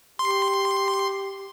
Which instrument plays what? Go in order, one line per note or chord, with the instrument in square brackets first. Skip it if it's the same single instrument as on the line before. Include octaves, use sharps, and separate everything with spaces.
[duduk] G4 [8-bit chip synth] C6